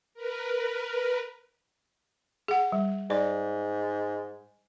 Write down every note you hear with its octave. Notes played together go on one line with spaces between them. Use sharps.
A#4 B4
G#4 F#5
G3
G#2 D5